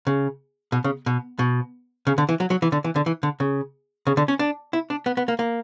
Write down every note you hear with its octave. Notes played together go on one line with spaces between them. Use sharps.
C#3
B2
C#3
B2
B2
C#3
D3
E3
F#3
F#3
E3
D3
E3
D3
E3
D3
C#3
C#3
D3
C#4
D4
E4
D4
B3
B3
A#3
A#3